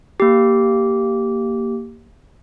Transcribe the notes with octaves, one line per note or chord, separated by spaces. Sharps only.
A#3 G4